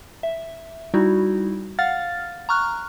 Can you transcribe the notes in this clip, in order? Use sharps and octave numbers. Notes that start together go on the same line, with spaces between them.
E5
G3 D#4 E4 F#4
F5 F#5 F6 A6
A#5 C#6 F6 F#6